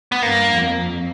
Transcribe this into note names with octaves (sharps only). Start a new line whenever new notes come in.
B3
G2 A#3
F2
F2